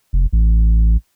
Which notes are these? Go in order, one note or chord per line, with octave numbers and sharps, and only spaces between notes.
F1
A1